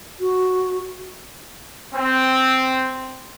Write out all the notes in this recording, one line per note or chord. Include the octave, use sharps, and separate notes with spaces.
F#4
C4